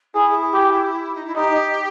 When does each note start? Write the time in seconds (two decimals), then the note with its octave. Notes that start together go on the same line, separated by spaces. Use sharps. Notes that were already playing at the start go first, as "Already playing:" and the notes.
0.14 E4 G#4
0.54 G4
1.15 D#4
1.25 E4
1.35 D#4 G4